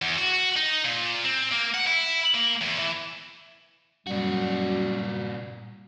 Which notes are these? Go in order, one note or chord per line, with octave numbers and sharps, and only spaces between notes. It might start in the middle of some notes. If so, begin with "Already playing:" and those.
E2
F#4
D#4
A#2
C4
A#3
F#5
E4
A#3
E2
E3
F#2 A#2 G3 F#4